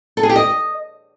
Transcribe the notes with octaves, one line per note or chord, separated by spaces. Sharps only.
A4
G#4
G4
D#5